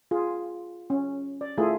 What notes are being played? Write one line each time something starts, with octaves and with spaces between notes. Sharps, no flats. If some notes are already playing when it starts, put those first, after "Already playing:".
F4 G#4
C#4
D5
A3 E4 F4 G#4